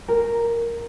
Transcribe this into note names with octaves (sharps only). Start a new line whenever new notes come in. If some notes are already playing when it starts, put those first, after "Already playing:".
A#4